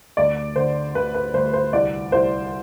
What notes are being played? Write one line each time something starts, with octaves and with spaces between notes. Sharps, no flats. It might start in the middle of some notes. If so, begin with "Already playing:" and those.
D2 D5
D3 C5
D2 B4
B4
D2 C5
C5
C2 D5
C2 C5